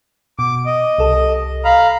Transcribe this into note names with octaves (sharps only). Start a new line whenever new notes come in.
B2 D6
D#5
C2 A4
F5 A#5 B5